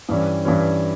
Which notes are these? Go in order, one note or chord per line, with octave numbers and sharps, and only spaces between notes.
G2 E3 G3 C#4
G2 E3 G3 C#4